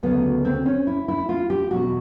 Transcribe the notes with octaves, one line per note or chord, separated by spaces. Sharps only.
D2 C#3 F#3 B3
C4
C#4
E4
E4
F4
G4
E2 B2 F#3 F#4